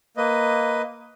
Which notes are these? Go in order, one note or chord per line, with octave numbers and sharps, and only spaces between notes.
A#3 B4 D#5